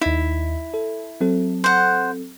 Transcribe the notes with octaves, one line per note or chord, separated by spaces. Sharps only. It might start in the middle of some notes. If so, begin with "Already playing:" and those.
D#2 D#4 E4
A4
F#3 C4 A4
C5 F#5